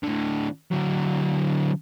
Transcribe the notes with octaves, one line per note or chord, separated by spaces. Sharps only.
A2 D3
D3 F#3